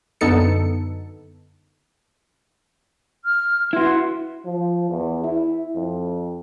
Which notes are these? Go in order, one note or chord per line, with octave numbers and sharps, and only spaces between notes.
F#2 D3 B3 D#4 A4 C#7
F6
E4 F#4 B4 E5 C6
F3
E2
E4
F2